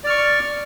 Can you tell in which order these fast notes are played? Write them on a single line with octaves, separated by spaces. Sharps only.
D5 F6 C#6